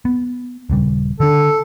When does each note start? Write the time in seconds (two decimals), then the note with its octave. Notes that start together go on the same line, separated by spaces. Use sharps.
0.05 B3
0.70 D#1 C#3 G3
1.20 D3 D4 A4